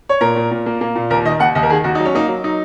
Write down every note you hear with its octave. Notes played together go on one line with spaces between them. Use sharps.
C#5
A#2 A#4
A#2
A#2
A#3
A#3
A#2
D#2 A#4
D#3 D#5
D#2 F#5
D#2 D#5
A#4
D#3 G#4
D#2 F#4
F#3 D#4
C#4
A#3 D#4
F#3
F#3 D#4